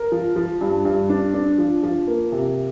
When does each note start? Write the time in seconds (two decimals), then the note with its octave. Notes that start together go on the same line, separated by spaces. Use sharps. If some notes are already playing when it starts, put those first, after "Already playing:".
Already playing: A#4
0.12 F3
0.36 F3
0.61 G2
0.85 G2
1.10 D4
1.34 D4
1.58 F3
1.83 F3
2.07 A#3
2.32 C3